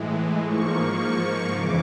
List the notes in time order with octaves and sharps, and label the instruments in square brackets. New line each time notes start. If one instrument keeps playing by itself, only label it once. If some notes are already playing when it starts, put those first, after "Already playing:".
Already playing: [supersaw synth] A2 E3 G#3
G#2 F3 A#3 C#6
C#6
F2 C#3 E3 D6